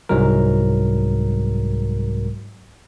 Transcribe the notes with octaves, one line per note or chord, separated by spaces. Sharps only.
C2 G#2 F#3 G#3 A#4